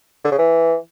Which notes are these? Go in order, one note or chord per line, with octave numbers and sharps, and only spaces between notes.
D3
C#3
E3